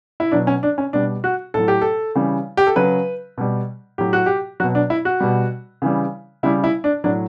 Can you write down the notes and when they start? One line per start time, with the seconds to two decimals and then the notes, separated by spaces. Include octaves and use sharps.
0.20 E4
0.32 B2 F#3 D4
0.47 C#4
0.63 D4
0.78 C#4
0.93 B2 G3 D4
1.24 F#4
1.54 A2 F#3 A4
1.68 G4
1.82 A4
2.15 C#3 E3 G3
2.57 G4
2.67 A4
2.76 C#3 F#3 B4
3.38 B2 G3
3.98 A2 F#3 G4
4.13 F#4
4.26 G4
4.60 B2 F#3 F#4
4.75 D4
4.90 E4
5.05 F#4
5.20 B2 G3
5.82 C#3 E3 G3
6.43 C#3 G3 E4
6.64 E4
6.84 D4
7.04 A2 F#3 D4